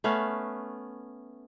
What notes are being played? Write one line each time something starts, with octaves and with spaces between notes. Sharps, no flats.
A3 B3 C#4 F5